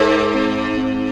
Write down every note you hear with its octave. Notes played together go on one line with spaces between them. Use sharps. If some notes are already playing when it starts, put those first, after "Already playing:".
Already playing: G#2 A#4
C4
C4